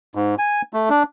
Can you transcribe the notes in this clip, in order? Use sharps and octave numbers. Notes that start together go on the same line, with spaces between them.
G#2
G#5
A3
D4